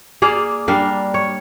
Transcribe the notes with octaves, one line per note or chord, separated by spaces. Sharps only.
A#3 G#4 D5 F5
G3 D4 A#4 F5
C#5